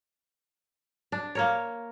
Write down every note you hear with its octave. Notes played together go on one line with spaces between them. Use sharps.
D4
A#3 A#4 C#5